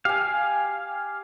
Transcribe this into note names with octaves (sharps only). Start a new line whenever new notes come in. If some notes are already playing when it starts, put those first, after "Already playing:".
G4 F5 G#5